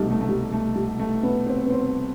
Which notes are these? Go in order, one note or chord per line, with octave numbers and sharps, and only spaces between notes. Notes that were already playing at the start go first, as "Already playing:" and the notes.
Already playing: C2 B2 G3 A3 D#4
A3
A3
G3
A3
G3
A3
B3
C4
B3
C4